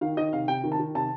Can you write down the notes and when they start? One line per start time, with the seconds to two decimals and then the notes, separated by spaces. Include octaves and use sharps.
0.01 D#3 F5
0.17 D#3 D#5
0.33 C3 F5
0.48 C3 G5
0.64 D#3
0.72 A5
0.79 D#3
0.95 C3 A5